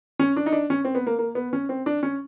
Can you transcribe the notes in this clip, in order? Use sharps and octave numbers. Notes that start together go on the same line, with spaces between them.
C#4
D4
D#4
D4
C#4
C4
B3
A#3
A#3
B3
C#4
C4
D4
C#4